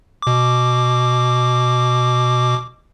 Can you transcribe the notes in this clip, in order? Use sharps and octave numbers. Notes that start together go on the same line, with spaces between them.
B2 D6